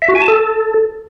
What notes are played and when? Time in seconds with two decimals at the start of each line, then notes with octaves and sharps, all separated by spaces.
0.02 E5
0.08 F#4
0.15 G#5
0.22 A5
0.28 A4